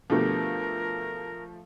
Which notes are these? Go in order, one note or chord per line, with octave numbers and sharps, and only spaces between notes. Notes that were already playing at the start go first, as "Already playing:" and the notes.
B2 D3 F3 A3 G4 A#4